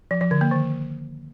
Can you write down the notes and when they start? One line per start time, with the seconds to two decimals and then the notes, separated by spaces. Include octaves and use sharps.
0.11 F3
0.21 F3
0.31 D3
0.41 A#3
0.51 D#3